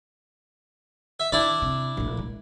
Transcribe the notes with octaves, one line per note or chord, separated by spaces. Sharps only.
E5
D#3 D4 E4 D5
C3
A#1 A3
G#3